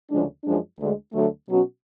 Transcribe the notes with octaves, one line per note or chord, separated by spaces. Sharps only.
D2 C#3 F3 G#3 D4
F#2 F3 G#3 D4
D2 D3 G#3
D2 D3 F#3 A3
B2 F#3 C#4 F#4